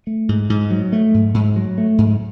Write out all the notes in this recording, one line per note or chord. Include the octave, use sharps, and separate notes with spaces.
A3
G#2
G#2
F#3
A3
G#2
G#2
F#3
A3
G#2